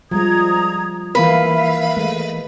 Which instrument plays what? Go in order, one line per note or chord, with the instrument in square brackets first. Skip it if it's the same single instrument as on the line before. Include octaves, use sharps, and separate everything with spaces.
[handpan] F3 G3 G#3 [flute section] A#5 D#6 G#6
[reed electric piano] E3 A#3 A#4 [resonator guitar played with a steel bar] B4 [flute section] E5 F5
[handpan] G#3 A3